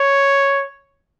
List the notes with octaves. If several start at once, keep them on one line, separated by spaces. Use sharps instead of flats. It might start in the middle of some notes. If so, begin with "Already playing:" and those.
Already playing: C#5